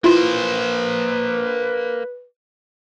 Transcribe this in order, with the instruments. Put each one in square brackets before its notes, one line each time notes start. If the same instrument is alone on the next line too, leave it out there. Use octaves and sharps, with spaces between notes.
[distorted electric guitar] A#3 C5 [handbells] E4 F4 [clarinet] B4